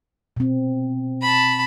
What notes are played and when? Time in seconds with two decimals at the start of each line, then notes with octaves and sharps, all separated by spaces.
0.37 B2 C4
1.21 A5 B5